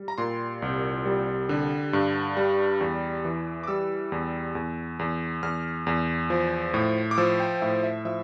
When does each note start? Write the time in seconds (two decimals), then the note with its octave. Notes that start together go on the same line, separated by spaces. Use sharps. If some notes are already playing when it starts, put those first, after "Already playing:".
Already playing: G3
0.08 A#5
0.18 A#2 C6
0.62 C2
1.06 G3
1.49 D3
1.93 G2
2.37 G3
2.81 E2
3.25 E3
3.63 D6
3.67 G3 E6
4.12 E2
4.55 E2
4.99 E2
5.43 E2 F6
5.87 E2
6.30 F3
6.74 A2
7.11 D6
7.18 F3 E6
7.40 G5
7.61 A2 E5
7.84 E5
8.05 F3 E5